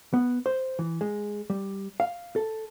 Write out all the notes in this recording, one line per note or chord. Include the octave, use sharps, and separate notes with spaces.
B3
C5
E3
G#3
G3
F5
A4